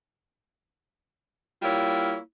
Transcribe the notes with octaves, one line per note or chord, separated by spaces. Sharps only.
G3 A#3 E4 F4 C#5